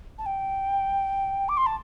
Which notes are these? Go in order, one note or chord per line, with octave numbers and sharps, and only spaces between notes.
A5
G5
D6
C6
A5